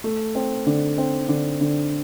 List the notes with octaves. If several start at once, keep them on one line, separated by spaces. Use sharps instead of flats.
A3
C4
D3
C4
D3
D3